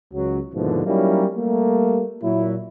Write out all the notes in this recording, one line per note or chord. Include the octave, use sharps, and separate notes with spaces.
C#2 F#3
D#2 G#2 B2 D3 E3 F3
F#3 G3 A#3 C#4 D#4 E4
G3 A3 A#3
A#2 F#3 E4